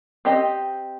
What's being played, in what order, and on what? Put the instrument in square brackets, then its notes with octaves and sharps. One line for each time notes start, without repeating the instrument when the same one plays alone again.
[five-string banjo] C4 G4 D#5